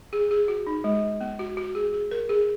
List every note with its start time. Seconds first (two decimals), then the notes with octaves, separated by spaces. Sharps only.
0.13 G#4
0.31 G#4
0.48 F#4
0.67 D#4
0.84 G#3
1.21 B3
1.39 F#4
1.57 F#4
1.75 G#4
1.93 G#4
2.11 A#4
2.29 G#4